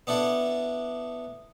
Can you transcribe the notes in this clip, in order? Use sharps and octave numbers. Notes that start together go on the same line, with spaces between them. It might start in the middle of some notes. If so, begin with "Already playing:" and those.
B3 D4 E4 A4